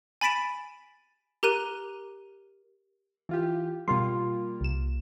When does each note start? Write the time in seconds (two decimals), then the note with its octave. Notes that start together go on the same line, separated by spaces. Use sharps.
0.21 G#5 B5 A6 B6 D7 E7
1.43 G4 A#4 A#5 F#6 D#7
3.29 E3 F4 G4
3.88 B2 G3 A#3 F4 C6
4.61 C2 E7